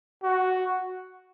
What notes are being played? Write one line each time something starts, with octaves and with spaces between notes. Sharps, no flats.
F#4